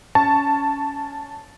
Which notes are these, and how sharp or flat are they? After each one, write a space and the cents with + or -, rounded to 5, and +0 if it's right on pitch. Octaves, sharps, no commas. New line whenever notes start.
C#4 +20 A5 +0 C#6 +0